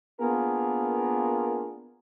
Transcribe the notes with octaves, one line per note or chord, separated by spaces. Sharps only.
A#3 B3 D4 F4 G#4 A#4